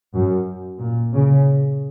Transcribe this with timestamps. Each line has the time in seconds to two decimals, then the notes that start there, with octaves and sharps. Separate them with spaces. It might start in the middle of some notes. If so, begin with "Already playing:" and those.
0.13 F#2
0.80 A#2
1.13 C#3